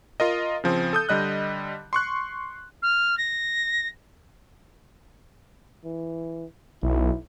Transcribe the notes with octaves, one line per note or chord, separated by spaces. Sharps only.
F4 A#4 D#5
C#3 F3 C4
A4 D#6 G6
D3 G3 D#5 F#6
C6 C#6 F#6
F6
A#6
E3
B1 E4